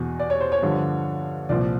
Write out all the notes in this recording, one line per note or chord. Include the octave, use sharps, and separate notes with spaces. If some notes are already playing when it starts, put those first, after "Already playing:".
Already playing: E2 B2
D5
C#5
C5
C#5
G2 D3 F3
C2 A#2 F3 D5